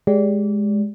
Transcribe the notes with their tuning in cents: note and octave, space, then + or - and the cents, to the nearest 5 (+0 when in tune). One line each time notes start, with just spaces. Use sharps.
G#3 +0 G4 +0 D5 -25